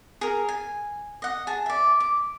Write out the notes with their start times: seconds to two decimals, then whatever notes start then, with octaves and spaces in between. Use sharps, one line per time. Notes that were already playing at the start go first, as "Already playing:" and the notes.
0.21 G#4 A#4
0.49 G#5
1.22 D#5 F#5
1.47 G#4 A5
1.66 D5 E5
2.00 D6